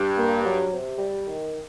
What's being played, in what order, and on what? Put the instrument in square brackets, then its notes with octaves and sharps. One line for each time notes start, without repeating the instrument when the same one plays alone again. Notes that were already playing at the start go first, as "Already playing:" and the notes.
Already playing: [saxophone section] G2
[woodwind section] A#3
F#3
C3
G3
D#3